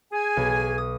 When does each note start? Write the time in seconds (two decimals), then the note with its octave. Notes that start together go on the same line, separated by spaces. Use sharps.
0.12 G#4 G#5
0.37 B1
0.78 D#6